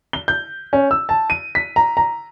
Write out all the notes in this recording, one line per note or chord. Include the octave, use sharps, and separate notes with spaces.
G7
G6
C#4
E6
A5
D#7
B6
A#5
A#5